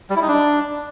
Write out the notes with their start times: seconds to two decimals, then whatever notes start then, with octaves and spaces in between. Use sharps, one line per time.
0.10 G3
0.16 E4
0.22 D#4
0.28 D4